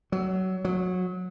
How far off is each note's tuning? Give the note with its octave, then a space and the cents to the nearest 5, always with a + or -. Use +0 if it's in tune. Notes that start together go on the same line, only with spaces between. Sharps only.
F#3 +20
F#3 -20